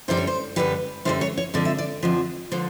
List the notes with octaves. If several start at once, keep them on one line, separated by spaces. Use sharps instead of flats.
F#2 D3 G3 C5
C#5
C5
F#2 D3 G3 B4
F#2 D3 G3 C5
C#5
C#5
F2 D3 F3 D5
E5
D5
F2 D3 F3
D3 F3 C5